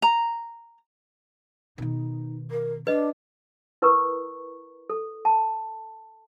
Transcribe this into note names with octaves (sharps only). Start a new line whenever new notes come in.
A#5
B2 D#3 D#4
A#4
D4 B4 D#5
E4 A#4 B4 A#5 C#6
A4
A5